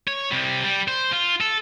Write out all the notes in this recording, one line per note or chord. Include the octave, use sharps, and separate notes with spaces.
C#5
C3 G3
G3
C5
F4
A4